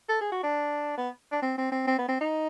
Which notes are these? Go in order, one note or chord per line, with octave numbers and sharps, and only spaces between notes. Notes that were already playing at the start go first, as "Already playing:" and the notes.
A4
G#4
F#4
D4
B3
D4
C4
C4
C4
C4
B3
C4
D#4